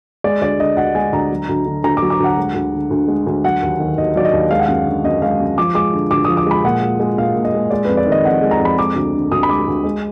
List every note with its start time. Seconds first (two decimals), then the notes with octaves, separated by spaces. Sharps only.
0.24 G#3 D5
0.41 D2 D5
0.59 D3 D#5
0.77 D2 F#5
0.95 G#3 G#5
1.13 D2 A#5
1.31 F#3
1.49 D2
1.66 D3
1.84 D2 A#5
1.97 D6
2.02 F#3
2.10 D6
2.20 D2 F#5
2.37 G#3
2.54 D2
2.73 D3
2.90 D2
3.08 G#3
3.27 D2
3.44 F#3 F#5
3.62 D#2
3.80 D#3
3.97 D#2 D#5
4.15 F#3 D5
4.25 D#5
4.33 D#2
4.51 G#3 F5
4.59 F#5
4.66 F#2 F5
4.86 D3
5.04 F#2 D#5
5.22 G#3 F5
5.40 F#2
5.58 F3 D6
5.75 G#3 D6
5.93 D3
6.11 D2 D6
6.25 F3 D#6
6.37 D6
6.47 G#3 B5
6.64 A#2 F#5
6.82 G#3
7.00 G#3
7.18 A#2 F5
7.36 A#2
7.45 D#5
7.54 G#3
7.71 G#3 D5
7.85 F2 B4
7.97 D5
8.07 D#3 D#5
8.24 F2 F#5
8.42 G#3
8.51 A#5
8.60 F2
8.65 B5
8.78 G#3 D6
8.96 D2
9.14 D3
9.32 D2 D#6
9.43 B5
9.49 G#3 D6
9.67 D2
9.84 G#3